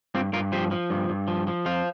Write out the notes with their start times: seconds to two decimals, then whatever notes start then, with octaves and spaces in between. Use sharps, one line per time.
0.15 G2 C4 F4
0.33 G2 F4 A#4
0.52 F3 G4 C5
0.71 F3
0.90 G2
1.09 G2
1.28 F3
1.47 F3
1.66 F2 C5 F5